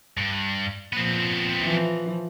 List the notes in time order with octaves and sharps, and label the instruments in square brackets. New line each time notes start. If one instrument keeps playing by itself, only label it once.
[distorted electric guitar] G2
[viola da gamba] A#2 F3 [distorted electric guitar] B3 C4
[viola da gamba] E3 F3